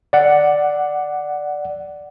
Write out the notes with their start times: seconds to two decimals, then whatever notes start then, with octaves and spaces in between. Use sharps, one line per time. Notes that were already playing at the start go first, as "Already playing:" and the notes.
0.13 D5 F#5